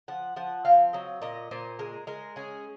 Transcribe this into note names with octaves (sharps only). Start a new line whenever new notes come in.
F3 F#5
F3 F#5
C4 F5
F#3 D#5
A#2 D#5
A#2 C5
G#3 A#4
G#3 A#4
C#4 G#4